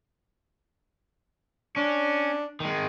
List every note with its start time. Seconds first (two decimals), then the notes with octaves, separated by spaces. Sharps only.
1.76 C#4 D4
2.60 D#3 G#3